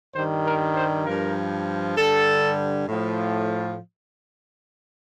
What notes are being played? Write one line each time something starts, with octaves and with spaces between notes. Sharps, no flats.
G2 D#3 G3 C5
A#4
C5
G2 F3 A#4
G2 D3 G3 A4
A2 F3